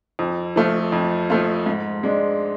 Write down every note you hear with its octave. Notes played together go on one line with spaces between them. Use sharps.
F2
F3 A3 F4
F2
F3 A3 F4
G#2
G#3 D4